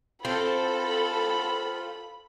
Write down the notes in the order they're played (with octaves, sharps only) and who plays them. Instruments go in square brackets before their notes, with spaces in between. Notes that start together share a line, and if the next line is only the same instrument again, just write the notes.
[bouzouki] C4 [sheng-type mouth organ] F4 [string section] A4 [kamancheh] B5